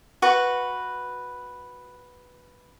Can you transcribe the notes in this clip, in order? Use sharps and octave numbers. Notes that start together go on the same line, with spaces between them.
F#4 B4 C#6